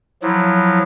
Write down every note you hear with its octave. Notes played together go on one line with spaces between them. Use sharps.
F3 F#3 E4